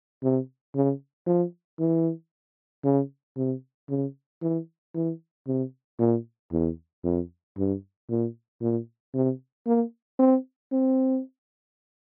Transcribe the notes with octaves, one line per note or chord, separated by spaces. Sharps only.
C3
C#3
F3
E3
C#3
C3
C#3
E3
E3
C3
A#2
E2
F2
G2
A#2
A#2
C3
A#3
C4
C4